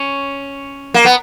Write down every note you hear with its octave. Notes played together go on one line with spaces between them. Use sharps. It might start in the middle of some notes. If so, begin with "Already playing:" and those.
Already playing: C#4
A#3
B3